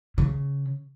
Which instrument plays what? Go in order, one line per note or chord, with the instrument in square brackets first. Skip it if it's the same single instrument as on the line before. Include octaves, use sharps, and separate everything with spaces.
[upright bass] C#3